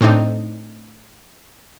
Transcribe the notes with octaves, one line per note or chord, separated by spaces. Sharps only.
A2 C4 D4 D#4